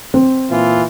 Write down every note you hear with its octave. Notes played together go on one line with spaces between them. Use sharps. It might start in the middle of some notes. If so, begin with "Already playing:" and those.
C4
A#2 E3 F4